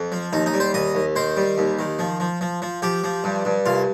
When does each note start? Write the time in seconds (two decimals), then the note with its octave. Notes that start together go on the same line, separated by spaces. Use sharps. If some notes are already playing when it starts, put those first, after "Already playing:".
Already playing: F2
0.12 F3
0.33 D#2 D#4
0.46 D#4
0.54 G3
0.60 C5
0.74 D#2 D#5
0.95 D#2
1.16 D#3 C5
1.37 G3
1.58 D#2
1.79 D#3
1.99 F3
2.20 F3
2.41 F3
2.62 F3
2.82 F3 G4
3.04 F3
3.24 G2
3.45 G2
3.66 C2 F4